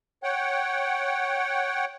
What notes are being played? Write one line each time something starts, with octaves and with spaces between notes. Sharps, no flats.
C#5 F#5 G5